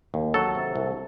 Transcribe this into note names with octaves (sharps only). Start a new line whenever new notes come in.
D#2
F#3 A4
C3
C2